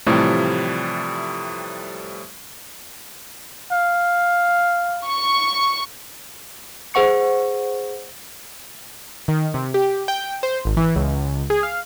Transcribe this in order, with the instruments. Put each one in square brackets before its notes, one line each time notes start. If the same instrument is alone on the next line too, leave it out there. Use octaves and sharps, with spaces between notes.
[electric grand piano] A2 C3 E3 F3 G3 A3
[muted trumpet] F5
[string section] C#6
[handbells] G#4 C5 F#5 C#6 C#7
[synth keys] D#3
C3
G4
G5
C5
G#1
E3
C#2
G#4
F5